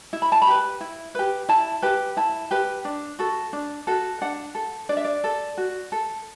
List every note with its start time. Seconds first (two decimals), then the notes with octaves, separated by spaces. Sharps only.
0.13 E4
0.22 B5
0.32 A5
0.42 B5
0.47 G4 B4
0.81 E4
1.15 G4 B4
1.49 E4 A5
1.82 G4 B4
2.17 E4 A5
2.51 G4 B4
2.85 D4
3.19 F#4 A4
3.53 D4
3.87 F#4 A4
4.21 D4 F#5
4.55 A4
4.89 D4 D5
4.97 E5
5.05 D5
5.24 A4
5.58 F#4
5.92 A4